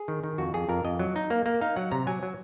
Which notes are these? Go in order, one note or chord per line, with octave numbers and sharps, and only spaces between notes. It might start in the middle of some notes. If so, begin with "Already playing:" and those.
Already playing: G#4
D#3
D#3
F2 F#4
F2 G#4
F2 A#4
F2 D#5
F#3
D#4
A#3
A#3
D#4 F5
F#3 F#5
C3 A#5
F#3 G#5
F#3